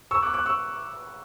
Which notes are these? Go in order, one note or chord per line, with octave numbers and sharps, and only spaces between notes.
C#6 E6
D6 F#6
D6 F#6
C#6 E6